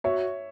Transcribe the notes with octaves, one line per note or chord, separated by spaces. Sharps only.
F#4 C#5 E5